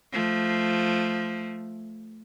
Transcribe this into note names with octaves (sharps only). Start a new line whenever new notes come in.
F3 A3